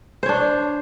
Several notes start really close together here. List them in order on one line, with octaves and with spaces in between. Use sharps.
C5 C#5 D4